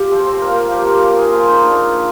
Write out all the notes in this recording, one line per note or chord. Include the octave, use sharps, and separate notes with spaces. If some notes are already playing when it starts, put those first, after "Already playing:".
Already playing: F4 G4
F3 C4
C4
A#2 A#3
F3 G4
A#4
F3 A#4
G#4
F3 F4
D#4
A#2 D4
F3